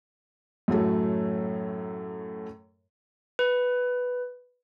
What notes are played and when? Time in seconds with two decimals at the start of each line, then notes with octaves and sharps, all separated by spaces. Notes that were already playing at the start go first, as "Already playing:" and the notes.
0.68 F#2 A2 F#3 A3
3.39 B4